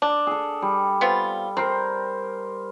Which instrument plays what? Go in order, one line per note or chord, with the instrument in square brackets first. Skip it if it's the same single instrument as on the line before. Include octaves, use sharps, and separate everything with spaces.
[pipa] D4 [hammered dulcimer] D5
[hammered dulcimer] G#4 A4
G3
[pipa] B3 C4 F4
[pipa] C4 [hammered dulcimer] A#4 C5 A#5